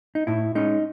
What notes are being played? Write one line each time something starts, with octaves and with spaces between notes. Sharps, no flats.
D#4
A2 E4
G#3 C#4 D#4